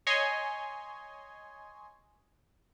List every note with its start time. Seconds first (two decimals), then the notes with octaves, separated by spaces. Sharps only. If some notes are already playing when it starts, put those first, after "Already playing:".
0.07 C#5 D#5 G#5 C6